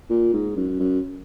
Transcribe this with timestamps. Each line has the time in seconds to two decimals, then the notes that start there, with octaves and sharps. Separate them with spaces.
0.10 A#2
0.33 G#2
0.57 F#2
0.80 F#2